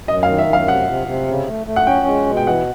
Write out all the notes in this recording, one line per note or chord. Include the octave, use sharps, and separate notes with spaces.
F#2 D#5
F5
D#3
E5
F#2 F5
C3 F#5
C3
C3
C#3
A3
A3
F#5
C#4 G5
G#3
B2
G5
E3 F#5